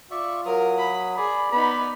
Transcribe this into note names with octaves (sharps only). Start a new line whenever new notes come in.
F4 D5 E5 C#6
F#3 A#4 D#6
B5
G#4 D5 B5
B3 D#4 B5